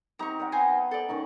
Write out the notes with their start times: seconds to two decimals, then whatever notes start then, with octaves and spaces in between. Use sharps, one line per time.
0.19 C4 D#4 G4 A#5 C#6
0.39 A#4 D5 F#5
0.52 B3 C5 G#5 A#5
0.91 A4 D5
1.09 D#3 C#4 D#4